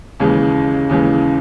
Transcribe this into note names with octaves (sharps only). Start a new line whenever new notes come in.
D#2 C#3 E3 G#3
D#2 C#3 E3 G#3